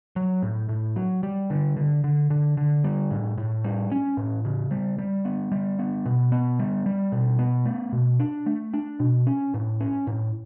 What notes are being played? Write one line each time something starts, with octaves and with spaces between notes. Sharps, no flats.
F#3
A2
A2
F#3
G3
D3
D3
D3
D3
D3
G3
A2
A2
G3
C#4
A2
C#3
G3
G3
B3
G3
B3
B2
B3
G3
G3
B2
B3
A3
B2
D4
A3
D4
B2
C#4
A2
C#4
A2